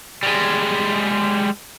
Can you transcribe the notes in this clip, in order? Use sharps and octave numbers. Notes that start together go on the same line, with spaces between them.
G3 G#3